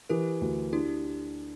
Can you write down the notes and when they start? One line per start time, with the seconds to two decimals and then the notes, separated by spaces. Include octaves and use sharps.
0.09 E3 G4 A#4
0.41 D2
0.72 D4 E4 G4